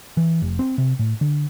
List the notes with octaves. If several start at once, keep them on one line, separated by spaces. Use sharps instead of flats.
E3
F1
C4
C3
A2
D3